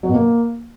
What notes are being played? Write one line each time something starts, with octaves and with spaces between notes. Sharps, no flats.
F#3
B2
A#3